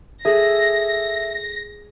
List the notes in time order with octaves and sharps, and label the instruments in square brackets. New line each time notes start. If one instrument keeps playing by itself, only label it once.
[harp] G#4 [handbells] A4 E5 [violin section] A#6